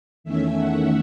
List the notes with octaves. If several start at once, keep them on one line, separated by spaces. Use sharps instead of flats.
E2 D#3 A3 C#4 E5
F#5